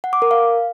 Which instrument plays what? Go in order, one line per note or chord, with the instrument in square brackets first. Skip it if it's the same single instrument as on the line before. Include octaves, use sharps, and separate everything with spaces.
[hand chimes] F#5
D6
A#4
F5